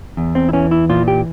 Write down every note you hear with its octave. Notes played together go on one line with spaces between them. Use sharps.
E2
C4
E4
E3 C#4
E4
A#2 F4
G4